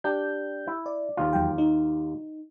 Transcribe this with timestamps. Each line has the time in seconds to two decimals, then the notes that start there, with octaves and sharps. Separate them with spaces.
0.04 D4 G4 G6
0.67 E4
0.86 D5
1.17 D#2 F4
1.33 E2 F#3 G5
1.58 D#4